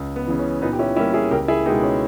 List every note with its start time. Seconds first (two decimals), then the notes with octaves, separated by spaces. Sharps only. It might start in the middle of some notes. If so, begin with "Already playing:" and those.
Already playing: C#2
0.16 B3
0.27 C#3 E3
0.39 C#4
0.62 A#2 B3 D#4
0.73 G4
0.79 C#4 E4
0.96 G3 A#3 C#4 E4
1.14 E4 G#4
1.31 C#2 G4 A#4
1.48 E4 G#4
1.66 B2 G#3 B3 D#4 G4
1.83 C#4